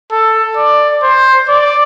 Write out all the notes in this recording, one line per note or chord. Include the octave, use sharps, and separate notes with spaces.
A4
D5
C5
D5